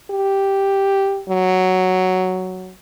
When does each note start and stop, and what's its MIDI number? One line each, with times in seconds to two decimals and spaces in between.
0.11 1.22 67
1.29 2.72 54